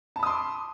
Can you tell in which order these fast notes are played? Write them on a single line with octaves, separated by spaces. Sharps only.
A5 B5 D#6 C6 D6